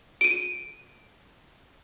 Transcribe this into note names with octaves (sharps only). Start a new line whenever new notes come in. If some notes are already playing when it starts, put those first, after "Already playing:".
D7 D#7